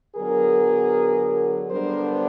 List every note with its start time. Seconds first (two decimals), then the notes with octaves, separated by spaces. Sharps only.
0.16 D3 F#3 B3 G#4 A#4
1.70 D3 G3 B3 D4 A#4 C5